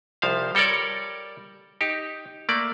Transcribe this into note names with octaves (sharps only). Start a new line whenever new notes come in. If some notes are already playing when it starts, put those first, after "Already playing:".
C2 F3 C5 F5
G3 A4 A#4 C#5 D5
D#4 G4
A3 A#3 D5